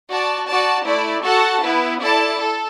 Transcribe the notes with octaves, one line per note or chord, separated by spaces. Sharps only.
F#4 D5 A5
F#4 D5 A5
A3 E4 D5
F#4 A4 F#5 A5
B3 E4 B4
E4 A4 D5 A5
A4